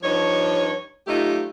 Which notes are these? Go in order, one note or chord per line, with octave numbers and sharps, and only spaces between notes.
G2 F3 D#4 C#5
F#3 A3 D#4 F4 G4